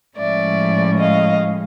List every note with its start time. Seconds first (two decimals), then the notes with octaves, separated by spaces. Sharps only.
0.18 A2 F3 G#3 C#4 D5 E5
0.99 D#5 F5